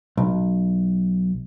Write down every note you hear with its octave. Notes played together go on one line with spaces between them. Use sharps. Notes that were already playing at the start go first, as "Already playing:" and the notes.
B1